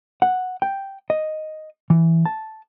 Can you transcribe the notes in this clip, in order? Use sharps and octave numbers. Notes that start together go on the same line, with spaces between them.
F#5
G5
D#5
E3
A5